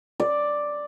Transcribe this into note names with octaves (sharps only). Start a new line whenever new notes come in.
D5